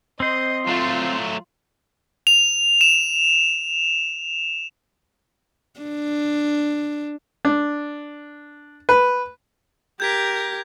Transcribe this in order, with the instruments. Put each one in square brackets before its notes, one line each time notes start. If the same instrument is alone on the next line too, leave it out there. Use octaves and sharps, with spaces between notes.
[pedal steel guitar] C4 C5 [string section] D#5
[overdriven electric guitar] F#3 A3 [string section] F4
[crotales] F7
E7
[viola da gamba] D4
[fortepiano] D4
B4
[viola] G4 A#4 [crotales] G6 G#6 B6